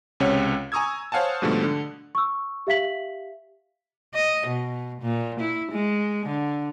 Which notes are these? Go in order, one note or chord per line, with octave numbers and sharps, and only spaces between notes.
C#2 C3 C#4 C#5 F#5
G#5 A#5 C#6 D#6 E6 G#6
C5 C#5 F5 F#5 G#5 A5
G#2 B2 D3 F3 G3 A3
D3
C#6 E6
G4 E5 F5 B6 F#7
D#5
B2
A#2
E4
G#3
D3